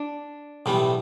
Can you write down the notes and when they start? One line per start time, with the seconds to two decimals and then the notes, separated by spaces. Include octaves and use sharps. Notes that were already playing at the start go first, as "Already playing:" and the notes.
Already playing: D4
0.66 B1 A2 E3 G3 B3